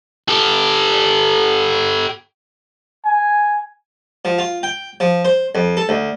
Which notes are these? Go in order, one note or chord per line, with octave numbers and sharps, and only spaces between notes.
G4 A4
G#5
F3
F4
G5
F3
C5
F2
A4
D2